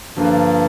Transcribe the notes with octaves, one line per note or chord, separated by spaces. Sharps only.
G2 D3 F3 A#3 F4